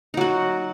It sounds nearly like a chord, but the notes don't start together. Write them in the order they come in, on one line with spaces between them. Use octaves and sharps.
D#4 F#3 F#4